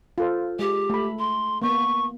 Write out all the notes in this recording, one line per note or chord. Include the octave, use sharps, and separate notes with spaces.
F4 A4 C5
G#3 G4
A3 B5
C6
A#3 B3 C#6